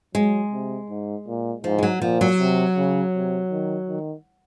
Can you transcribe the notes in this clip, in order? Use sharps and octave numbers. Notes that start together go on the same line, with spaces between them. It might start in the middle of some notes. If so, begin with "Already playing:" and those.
F#3 G#3
C3
G#2
A#2
G#2 F3
G#3
F#3
A#2 F3
F#3
C3
C#3
C3
D#3
D#3